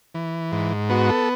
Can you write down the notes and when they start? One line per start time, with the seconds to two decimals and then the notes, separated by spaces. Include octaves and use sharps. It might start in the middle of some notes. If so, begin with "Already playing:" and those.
0.15 E3
0.52 G#2
0.89 B3 F#4
1.09 A4